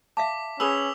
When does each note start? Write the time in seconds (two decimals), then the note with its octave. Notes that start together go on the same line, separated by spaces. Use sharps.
0.17 E5 F5 A5 D6 B6
0.60 C#4 G#4 B4 E6 F7 G7